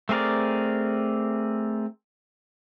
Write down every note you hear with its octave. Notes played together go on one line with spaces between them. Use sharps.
A3 C4 G#4 A#4 D5